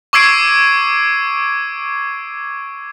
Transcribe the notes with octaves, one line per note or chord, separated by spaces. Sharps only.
C#6 D6 E6 G#6 C7 D7